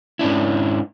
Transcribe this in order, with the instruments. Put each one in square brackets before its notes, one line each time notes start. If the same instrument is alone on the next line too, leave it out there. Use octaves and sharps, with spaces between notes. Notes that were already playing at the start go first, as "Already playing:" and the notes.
[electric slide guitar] G#2 C#4 D4 E4